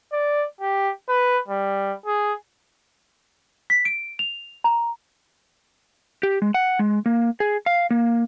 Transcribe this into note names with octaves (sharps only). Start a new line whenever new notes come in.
D5
G4
B4
G3
G#4
B6
D7
F7
A#5
G4
G#3
F#5
G#3
A#3
G#4
F5
A#3